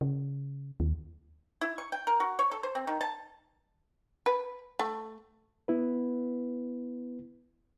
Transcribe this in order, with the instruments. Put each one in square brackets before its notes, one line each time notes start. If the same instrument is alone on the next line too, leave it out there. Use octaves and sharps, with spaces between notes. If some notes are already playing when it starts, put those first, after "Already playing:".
[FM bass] C#3
D#2
[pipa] E4
C#6
G5
A#4
F#4
C#5
A4
C5
C4
D#3
A5
[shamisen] B4
A3
[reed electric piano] B3 E4 B4